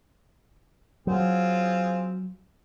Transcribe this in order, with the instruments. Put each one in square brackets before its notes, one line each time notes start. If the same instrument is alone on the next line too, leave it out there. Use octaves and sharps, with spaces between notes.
[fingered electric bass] F#3 [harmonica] C4 F4 G#4